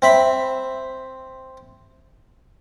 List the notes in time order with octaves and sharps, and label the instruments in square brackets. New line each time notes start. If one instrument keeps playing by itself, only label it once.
[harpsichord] C4 E5 B5